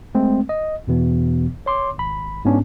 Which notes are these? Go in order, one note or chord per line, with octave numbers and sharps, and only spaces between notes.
G#3 A3 C4
D#5
E2 B2 E3 B3
C#5 C6 D6
G#1 B5
G#2 B3 C#4 D4